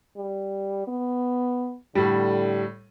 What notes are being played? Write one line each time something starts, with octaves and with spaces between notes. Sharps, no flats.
G3
B3
A2 D3 G3